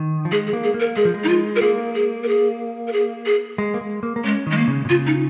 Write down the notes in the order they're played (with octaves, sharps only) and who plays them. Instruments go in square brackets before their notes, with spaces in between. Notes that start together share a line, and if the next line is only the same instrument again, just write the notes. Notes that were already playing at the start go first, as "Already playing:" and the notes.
Already playing: [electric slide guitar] D#3
F3
[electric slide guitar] G#3 [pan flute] G#4
[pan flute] G#4
[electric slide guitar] A#3
[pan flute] G#4
[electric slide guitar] A#3
[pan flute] A#4
[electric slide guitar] G#3 [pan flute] G#4
[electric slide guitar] F3
G#3
[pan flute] D#4
F4
A#4
[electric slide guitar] A#3 [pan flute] G#4
[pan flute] G#4
A#4
G#4
A#4
G#4
G#4
[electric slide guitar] G#3
A#3
G#3
A#3
A#3
[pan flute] G#3 [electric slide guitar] C#4
[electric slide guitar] D#3 [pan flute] G#3
[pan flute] A#3
[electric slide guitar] C#3
A#2
[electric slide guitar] C#3 [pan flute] F4
[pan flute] D#4